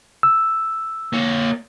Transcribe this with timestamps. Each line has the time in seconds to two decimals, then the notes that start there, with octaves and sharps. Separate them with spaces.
0.23 E6
1.13 A#3 C#5